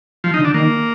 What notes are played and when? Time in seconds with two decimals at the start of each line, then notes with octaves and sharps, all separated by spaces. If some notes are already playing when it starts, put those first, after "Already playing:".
0.24 F3
0.34 D#4
0.39 D3
0.45 D4
0.54 D#3 A#3